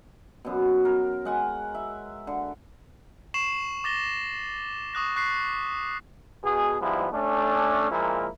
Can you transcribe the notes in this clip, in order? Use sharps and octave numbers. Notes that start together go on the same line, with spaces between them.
F#2 B2
A#4
G#3 F#5 G#5
E5
D3
C#6 C7 E7 F#7
D6 A6 A#6 G7
C#6 D#6 F#6 A#6
C#6 F#6 B6 C7
B2 G#4
G#2 F3 G3 G#3 B3 E4
A3 C#4 D4
A#2 F3 G#3 A#3 E4 A#4